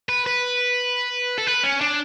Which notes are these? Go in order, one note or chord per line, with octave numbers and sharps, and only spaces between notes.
B4
B4
A4
B4
C#4
D4